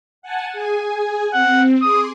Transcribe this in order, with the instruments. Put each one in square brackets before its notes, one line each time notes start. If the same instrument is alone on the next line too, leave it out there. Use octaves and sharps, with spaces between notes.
[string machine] F#5 G#5 A5
G#4 G#5
[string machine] C4 [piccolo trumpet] F#5
[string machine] G#4 C6 D6 [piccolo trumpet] D#6